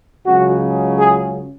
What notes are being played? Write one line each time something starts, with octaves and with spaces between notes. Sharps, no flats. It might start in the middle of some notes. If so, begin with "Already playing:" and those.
C#2 C#3 F#3 F#4
G#4